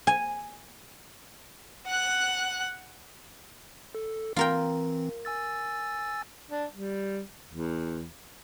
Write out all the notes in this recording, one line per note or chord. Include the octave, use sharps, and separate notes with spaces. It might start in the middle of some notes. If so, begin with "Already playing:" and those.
G#5
F#5 F#6
A4
E3 C4 F4 A#4 G5
G#5 E6 A6
D4
G3
E2